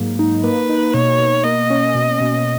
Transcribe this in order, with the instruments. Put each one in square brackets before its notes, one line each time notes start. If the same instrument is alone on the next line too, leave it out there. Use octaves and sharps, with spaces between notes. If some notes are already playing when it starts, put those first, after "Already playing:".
Already playing: [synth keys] G#2 F#3 A#3
D#4
[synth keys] A#3 [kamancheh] B4
[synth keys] D#4
[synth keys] B2 [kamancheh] C#5
[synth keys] B2
[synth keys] A#3 [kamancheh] D#5
[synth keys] C#4
B2
B2